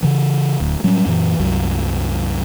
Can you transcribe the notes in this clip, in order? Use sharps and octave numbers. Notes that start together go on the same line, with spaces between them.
C#3 E3
D1 D2
A2 F#3 G3 C#4
F#2 A#2 E3
C2 F#2 F#3